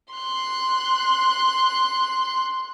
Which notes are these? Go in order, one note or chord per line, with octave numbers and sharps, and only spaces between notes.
C6 F#6